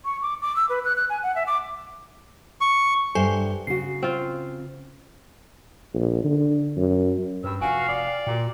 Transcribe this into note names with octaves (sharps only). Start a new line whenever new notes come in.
C#6
D6
D6
E6
B4
F#6
F#6
G#5
F#5
E5
D6
C#6
G2 A4 C5 E5 G#5
C#3 F#4 C7
C4 F4
A#1
D3
F#2
G2 B4 B5 E6
F1 D4 F#4 F5 G#5
F4 D5 D#6
G5
A#2 F#4 G4 G5